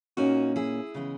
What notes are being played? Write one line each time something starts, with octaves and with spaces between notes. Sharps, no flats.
A#2 A#3 C#4 D#4 F#4
E4 G#4
C#3 E3 G#3 B3